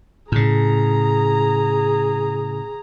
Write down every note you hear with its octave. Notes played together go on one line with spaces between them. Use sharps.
A2 C#3 G#4 A#5